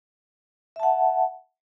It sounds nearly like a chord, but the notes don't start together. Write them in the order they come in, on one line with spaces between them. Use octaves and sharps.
E5 A5 F#5